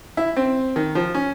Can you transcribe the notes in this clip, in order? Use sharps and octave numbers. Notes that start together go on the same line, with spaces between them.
E4
C4
D#3
F3
C#4